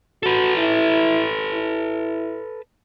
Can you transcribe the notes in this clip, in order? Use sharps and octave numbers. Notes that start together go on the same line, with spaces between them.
F#4 A4 B4
E4
E4